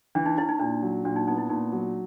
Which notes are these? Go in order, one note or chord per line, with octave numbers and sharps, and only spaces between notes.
E3 D4
D#4
C#4 E4
D#4
A#2 D4
F#3
A#2 D4
D#4
B3 D#4
E4
A#2 D#4
F#3